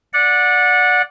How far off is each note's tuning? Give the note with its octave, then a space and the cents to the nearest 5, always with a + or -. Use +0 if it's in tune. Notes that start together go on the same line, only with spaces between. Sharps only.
D5 +0 F#5 -20